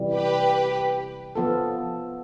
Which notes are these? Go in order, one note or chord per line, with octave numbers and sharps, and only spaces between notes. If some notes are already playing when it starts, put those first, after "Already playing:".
Already playing: C3 E3 G3
G4 B4
F3 B3 F4 A4